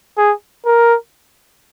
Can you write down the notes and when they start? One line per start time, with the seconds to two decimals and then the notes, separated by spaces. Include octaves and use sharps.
0.17 G#4
0.66 A#4